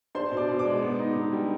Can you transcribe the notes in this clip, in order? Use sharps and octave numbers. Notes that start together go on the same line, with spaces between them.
D4 C5 C6
B2
D5 D6
B2
D5 D6
G#3
B3
D#4
D3
G3